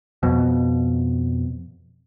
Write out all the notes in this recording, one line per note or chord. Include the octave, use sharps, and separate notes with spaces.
F2 B2